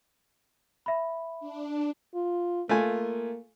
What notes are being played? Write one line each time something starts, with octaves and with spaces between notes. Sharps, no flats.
E5 B5
D4
F4
A3 A#3 F4 G#5